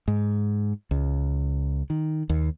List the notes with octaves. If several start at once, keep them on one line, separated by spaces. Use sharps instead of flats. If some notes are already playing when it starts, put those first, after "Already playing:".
G#2
C#2
D#3
D#2